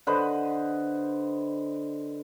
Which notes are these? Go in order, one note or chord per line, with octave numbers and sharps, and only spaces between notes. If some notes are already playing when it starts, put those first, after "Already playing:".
D3 B4 C5 D#5